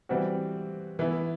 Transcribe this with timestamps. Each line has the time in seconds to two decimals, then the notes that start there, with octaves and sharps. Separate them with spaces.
0.09 E3 G3 C4 F#4
0.99 E3 B3 E4